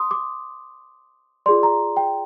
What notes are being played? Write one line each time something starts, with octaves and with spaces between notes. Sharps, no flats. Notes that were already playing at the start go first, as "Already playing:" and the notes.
Already playing: C6 D#6
D6
F4 G#4 D5 C6
A#5
G5